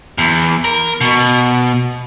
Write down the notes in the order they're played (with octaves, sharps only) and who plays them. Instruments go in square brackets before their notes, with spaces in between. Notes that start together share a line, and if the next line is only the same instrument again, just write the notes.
[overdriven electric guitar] E2
A#4
B2